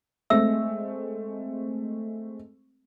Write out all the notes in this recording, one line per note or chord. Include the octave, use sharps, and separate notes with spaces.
G#3 A3 C4 E5 E6